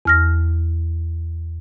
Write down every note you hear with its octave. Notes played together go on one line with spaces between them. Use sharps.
E2 F6 A#6